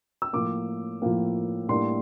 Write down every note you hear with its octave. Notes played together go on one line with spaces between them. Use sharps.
E6
A2 F3 A#3 D6
A2 F3 A#3
A2 G3 A#3 D4 C6